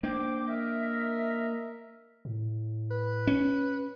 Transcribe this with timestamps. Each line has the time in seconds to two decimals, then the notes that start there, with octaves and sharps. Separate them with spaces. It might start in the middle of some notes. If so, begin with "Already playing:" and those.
0.03 A#3 D4 C5 G5 D6
0.48 A#4 D#5 E5
2.25 A2
2.91 B4
3.27 C#4